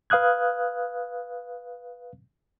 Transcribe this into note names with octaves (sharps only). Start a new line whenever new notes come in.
B4 F5 D#6 F#6 G#6